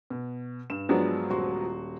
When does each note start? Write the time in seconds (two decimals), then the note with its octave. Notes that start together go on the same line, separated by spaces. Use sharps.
0.10 B2
0.70 G2 E7
0.89 F3 F#3 G#3 B3 D4
1.30 D#1 F#4 C6